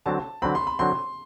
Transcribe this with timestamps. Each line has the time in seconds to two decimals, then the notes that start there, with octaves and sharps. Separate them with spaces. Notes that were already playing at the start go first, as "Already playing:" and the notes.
0.06 D3 F#3 C4 A5
0.42 D3 F#3 C4 B5
0.55 C6
0.67 B5
0.79 D3 F#3 C4 C6